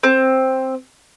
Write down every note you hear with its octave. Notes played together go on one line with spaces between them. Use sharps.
C4